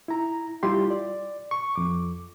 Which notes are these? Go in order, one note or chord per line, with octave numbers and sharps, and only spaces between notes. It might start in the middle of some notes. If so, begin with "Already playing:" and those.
E4 A#5
G3 E4 F4 G4 C6
D5
C#6
F2 D6